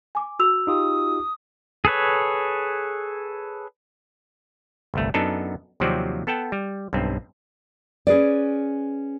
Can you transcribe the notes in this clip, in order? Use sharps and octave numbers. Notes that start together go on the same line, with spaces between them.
G#5 D6
F#4 E6 F7
D#4 F4 G4 D#6
G#4 A4 B4 C#5
G1 C2 A3
F#2 B3 D4 D#4 A4
D#2 C3 F3 F#3 C4 D5
B3 A4 F#5 G5 A5
G3
B1 G2 C4
C#4 G#4 B4 D5